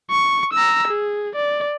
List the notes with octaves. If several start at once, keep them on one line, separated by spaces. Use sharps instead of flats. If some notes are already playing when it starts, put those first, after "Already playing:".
C#6
A#5 E6
G#4
D5